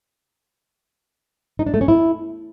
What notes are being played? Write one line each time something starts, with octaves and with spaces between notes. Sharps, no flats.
D#4
D4
A3
C#4
E4